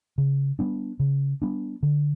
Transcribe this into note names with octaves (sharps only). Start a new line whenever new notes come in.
C#3
G3 B3 D4
C#3
G3 B3 D4
D3